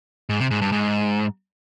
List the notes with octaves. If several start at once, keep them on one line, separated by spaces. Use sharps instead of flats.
G#2
C3
G#2
G2
G#2